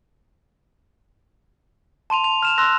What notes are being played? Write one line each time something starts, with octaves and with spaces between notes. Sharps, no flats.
A5 C6 D#7 F7
F7
F6 E7 F7
C6 E6 F#6 A#6